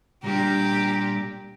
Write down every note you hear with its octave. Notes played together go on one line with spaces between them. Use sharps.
A#2 G3 A#3 D4 G4 A#5